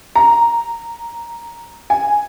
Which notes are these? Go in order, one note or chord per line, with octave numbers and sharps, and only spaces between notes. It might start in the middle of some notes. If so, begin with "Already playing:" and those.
A#5
G#5